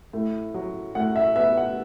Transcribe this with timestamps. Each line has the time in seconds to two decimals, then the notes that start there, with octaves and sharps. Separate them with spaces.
0.13 A2
0.54 F#3
0.95 A2 F#5
1.16 E5
1.36 B3 E5
1.57 F#5